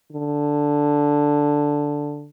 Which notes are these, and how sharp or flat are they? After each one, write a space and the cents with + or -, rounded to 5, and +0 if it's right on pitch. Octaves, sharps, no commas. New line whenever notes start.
D3 +0